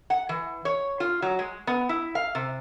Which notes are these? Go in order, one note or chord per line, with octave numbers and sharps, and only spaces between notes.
F#5
E3
C#5
F4
F#3
G#3
B3
E4
F5
C3